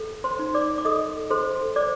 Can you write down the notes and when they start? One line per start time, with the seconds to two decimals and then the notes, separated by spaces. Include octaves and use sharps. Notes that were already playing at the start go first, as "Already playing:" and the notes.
Already playing: A4
0.24 C5 C6
0.39 D#4
0.54 D5 D6
0.78 D6
0.85 A4 D#5 D#6
1.30 A4 C5 C6
1.76 C5 D5 D6